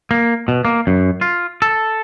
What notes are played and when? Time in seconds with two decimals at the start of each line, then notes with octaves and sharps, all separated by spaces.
0.11 A#3
0.48 B2
0.65 A#3
0.87 F#2
1.21 F4
1.62 A4